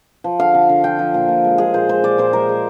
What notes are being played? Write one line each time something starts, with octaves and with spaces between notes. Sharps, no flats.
F3
D3 F5
D3
D3
F3 G5
F3
A#2
A#2
G#3
G#3 G#4
A#2 C5
G#3 C5
A#2 D5
A#2 C5
G#3 A#4
G#3